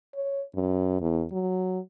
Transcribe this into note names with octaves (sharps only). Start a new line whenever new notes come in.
C#5
F#2
E2
F#3